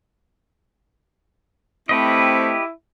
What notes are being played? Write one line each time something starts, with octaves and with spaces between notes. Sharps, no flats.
A3 C4 E4 G4 B4 D#5